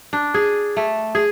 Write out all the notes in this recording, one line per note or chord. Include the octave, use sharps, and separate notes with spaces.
D4
G#4
A3
G#4